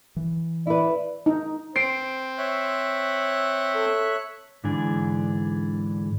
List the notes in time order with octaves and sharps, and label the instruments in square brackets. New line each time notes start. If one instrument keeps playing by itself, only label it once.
[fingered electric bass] E3
[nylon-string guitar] E4 B4 [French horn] D5
[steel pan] D#4
[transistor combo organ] C4 [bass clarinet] C5 [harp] C7 D7
[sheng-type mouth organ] C#5 E5 F#6
[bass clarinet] A4
[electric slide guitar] G#2 D3 E3 D4 G#4